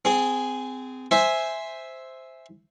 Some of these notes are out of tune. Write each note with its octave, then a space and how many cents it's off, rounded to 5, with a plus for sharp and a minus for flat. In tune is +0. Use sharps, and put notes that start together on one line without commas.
C4 -30 G#4 +0
C5 +0 E5 -5 G#5 +0